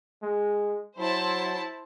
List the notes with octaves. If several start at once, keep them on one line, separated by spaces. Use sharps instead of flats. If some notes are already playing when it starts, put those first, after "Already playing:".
G#3
F#3 E4 C5 A5